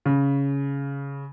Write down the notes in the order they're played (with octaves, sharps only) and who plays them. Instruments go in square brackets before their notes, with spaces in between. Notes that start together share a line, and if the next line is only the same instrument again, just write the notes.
[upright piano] C#3